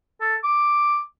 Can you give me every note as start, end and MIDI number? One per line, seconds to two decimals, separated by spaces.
0.21 0.35 69
0.44 1.00 86